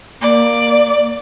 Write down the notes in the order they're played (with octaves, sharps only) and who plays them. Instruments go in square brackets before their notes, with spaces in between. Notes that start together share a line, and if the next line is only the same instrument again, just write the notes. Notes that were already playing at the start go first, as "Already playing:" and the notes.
[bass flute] A#3 [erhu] D5